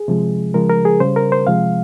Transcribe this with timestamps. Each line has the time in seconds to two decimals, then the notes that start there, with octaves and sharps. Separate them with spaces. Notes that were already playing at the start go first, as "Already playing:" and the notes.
Already playing: G#4
0.08 C3 F3 G#3
0.54 C#3 F3 G#3 A#4
0.70 A#4
0.85 G#4
1.00 C#3 G3 C5
1.16 A#4
1.32 C5
1.47 C3 F3 G#3 F5